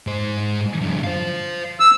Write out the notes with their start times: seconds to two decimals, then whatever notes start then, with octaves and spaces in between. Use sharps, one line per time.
0.07 G#2 C5
0.81 F#2 D3
1.04 C5 F5
1.80 E6